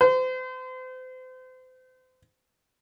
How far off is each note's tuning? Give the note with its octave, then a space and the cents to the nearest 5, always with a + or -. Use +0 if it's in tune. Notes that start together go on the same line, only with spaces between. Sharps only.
C5 -35